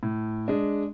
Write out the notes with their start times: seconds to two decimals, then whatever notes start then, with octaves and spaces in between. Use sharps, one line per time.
0.03 A2
0.48 G#3 D4